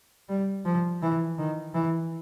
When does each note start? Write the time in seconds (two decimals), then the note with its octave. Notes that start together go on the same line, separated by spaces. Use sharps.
0.29 G3
0.65 F3
1.02 E3
1.39 D#3
1.75 E3